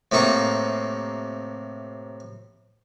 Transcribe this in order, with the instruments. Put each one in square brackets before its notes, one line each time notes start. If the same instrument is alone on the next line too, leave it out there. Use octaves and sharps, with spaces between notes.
[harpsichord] A2 C3 A#3 D#4 C#6